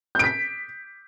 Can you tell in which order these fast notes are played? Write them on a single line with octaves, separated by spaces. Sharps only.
G6 D7 B6